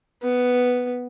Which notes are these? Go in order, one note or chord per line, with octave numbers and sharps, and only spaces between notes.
B3